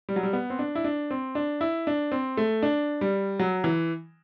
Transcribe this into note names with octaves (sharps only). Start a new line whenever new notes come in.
G3
F#3
G3
B3
C4
D4
E4
D4
C4
D4
E4
D4
C4
A3
D4
G3
F#3
E3